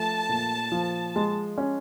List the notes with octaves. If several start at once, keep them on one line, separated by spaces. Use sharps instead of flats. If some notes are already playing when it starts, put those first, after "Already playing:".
Already playing: F3 A3 A5
A#2
F3
G#3
C#4